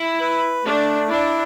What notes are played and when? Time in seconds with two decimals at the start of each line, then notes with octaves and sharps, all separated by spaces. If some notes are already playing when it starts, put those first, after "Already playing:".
Already playing: E4
0.20 B4
0.65 A3 D4
1.09 D4 E4